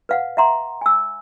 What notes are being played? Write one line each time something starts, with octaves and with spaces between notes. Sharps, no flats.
B4 F5 F#5
E5 F#5 A#5 C6
G#5 E6